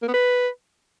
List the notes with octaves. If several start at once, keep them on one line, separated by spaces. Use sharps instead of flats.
A#3
B3
B4